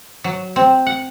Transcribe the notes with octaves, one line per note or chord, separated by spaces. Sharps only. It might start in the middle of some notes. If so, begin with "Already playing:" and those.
F#3
C4
F#5